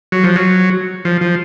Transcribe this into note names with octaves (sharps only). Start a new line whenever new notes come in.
F#3
F3
F#3
F3
F3